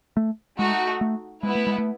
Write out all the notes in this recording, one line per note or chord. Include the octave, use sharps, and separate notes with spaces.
A3
G#3 A3 D#4 F#4
A3
G#3 B3 E4 B4
A3
G#3
A3